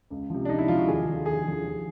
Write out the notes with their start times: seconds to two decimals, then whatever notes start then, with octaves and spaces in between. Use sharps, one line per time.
0.10 C#2
0.30 C3 F3
0.45 D4
0.49 C#2 D#4
0.58 E4
0.68 C3 F3 F4
0.78 F#4
0.87 D#2 G#4
1.06 D3 F3
1.26 D#2 G#4
1.45 D3 F3
1.64 D#2